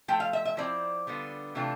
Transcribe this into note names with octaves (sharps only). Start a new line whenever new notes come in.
F3 A3 G5
F5
E5
E5
F3 C4 E4 D5
D3 G3 B3 F4
C3 E3 A3 D4 F4